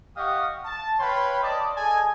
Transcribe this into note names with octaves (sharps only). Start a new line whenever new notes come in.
G4 D#5 F5 F#5 C#6 D#6
A5
B4 C#5 F5 G5 B5 C6
D5 D#5 A5
G#4 A4 D#5 G#5